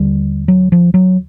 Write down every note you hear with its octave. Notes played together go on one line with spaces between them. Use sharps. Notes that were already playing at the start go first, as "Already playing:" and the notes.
Already playing: D#2 D3 G3
F#3
F3
F#3